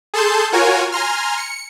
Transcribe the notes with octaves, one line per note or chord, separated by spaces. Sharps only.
G#4 A4 A5 C6 G6
F4 F#4 A#4 C#5 G#5
G#5 A#5 C6 F6
C#7